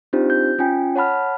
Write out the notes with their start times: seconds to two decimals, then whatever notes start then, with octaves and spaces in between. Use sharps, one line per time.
0.13 C4 D4 D#4 F4 G4 C5
0.30 G6
0.59 C#4 F4 G5 G#5
0.96 C#5 F#5 A5 B5 F6